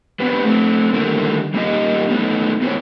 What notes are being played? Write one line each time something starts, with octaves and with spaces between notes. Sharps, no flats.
B3 C4 D4 G4 B4
A3 C4
D3 D#3 G3 A3 A#3 E4
G3 A#3 D4 D#4 G4 D#5
A3 B3 D#4
B3 E4 G4 A#4 C5 C#5